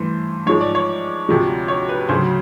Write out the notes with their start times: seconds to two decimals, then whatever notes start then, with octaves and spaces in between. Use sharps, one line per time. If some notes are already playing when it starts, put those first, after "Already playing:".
Already playing: G2 E3 A3 C5
0.47 G#2 F3 G#3 C#5
0.61 D5
0.75 C#5
1.29 D2 C3 F3 G#3
1.68 C#5
1.89 B4
2.09 D2 C#3 F#3 C5